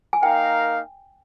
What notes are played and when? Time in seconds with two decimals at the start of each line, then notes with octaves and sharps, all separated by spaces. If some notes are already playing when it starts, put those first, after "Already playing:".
0.13 G#5
0.23 A#3 D#4 A#4 F5 G5